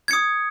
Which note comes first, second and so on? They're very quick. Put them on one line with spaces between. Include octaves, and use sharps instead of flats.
G#6 C#7 D#6